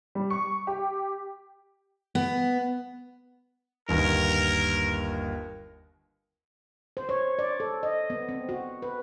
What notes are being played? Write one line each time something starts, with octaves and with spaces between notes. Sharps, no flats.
G3
C#6
G4
B3
G1 D#2 A#4
C5
C#5
D5
A4
D#5
B3
C4
F#4
B4